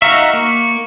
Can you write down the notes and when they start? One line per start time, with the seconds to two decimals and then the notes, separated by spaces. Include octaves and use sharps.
0.02 D#4 F#4 E5 F5 A#5 C#6
0.33 A#3 C#6